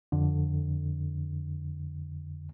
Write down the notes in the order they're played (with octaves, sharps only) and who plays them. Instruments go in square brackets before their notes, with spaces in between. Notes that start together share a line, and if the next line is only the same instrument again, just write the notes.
[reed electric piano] F2 D3